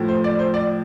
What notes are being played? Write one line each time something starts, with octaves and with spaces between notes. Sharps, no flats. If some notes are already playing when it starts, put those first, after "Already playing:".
Already playing: A2 F3
C5
D5
C5
D5